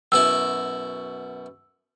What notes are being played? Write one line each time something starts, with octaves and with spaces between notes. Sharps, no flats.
F#2 B2 E4 E6